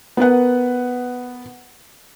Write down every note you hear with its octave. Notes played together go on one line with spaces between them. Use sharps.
B3 A#4 B4 F#5